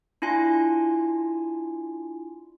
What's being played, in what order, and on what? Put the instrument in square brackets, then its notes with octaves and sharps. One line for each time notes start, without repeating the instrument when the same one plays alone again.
[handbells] D4 E4 F4 G#5 C6